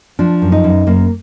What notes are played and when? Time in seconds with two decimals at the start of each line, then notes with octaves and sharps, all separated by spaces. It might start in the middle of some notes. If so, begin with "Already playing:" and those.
0.19 F3 D4
0.42 F#2
0.52 D#4
0.64 F#2
0.87 F#2 A#3